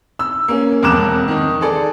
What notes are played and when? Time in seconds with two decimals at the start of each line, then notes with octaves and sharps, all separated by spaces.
0.19 E6
0.48 A#3 C#4
0.83 E1 F2 A#4 D6 F#6 E7
1.28 D#3 D#4
1.61 G#4 A4 D5